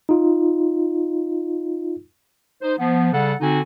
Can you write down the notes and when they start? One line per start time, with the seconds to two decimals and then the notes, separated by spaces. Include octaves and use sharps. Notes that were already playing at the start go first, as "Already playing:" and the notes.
0.09 D#4 F4
2.62 D#4 C5
2.78 F3 B3
3.13 C#3 G3 A4 F#5
3.41 D3 C4 D#4 F#4 G#5